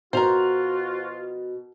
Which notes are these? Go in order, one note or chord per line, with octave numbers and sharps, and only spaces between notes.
B2 F3 F4 F#4 A#4 C5 F7